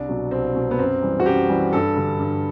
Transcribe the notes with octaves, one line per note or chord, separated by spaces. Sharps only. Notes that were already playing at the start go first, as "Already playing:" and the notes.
Already playing: C2 D4
B2 F#3
C2 C4
B2 F#3
B3
F#2 C4
E3 G3
F#4
F#2 G4
E3 G3
G2 A4
D3 G3
G2